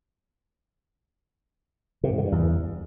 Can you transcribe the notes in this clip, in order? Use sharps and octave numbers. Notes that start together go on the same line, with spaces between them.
C3
G#2
D3
G2
E2